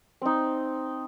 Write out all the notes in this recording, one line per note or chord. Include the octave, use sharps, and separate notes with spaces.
C4 D#4